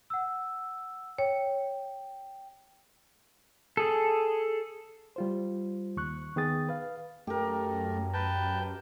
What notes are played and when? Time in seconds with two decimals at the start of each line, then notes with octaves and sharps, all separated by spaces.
0.10 F#5 E6
1.18 C#5 G5
3.77 G#4 A4
5.16 G3 F4 C5
5.97 D#2 C#6 F#6
6.36 D#3 B3 G#4 G5 D#6 A6
6.69 B4 F5
7.27 F#2 A3 G4 A#4
8.14 B4 G5 A5